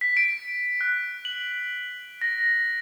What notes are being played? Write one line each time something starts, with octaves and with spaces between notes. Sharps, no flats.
B6
D7
F#6
F#7
A#6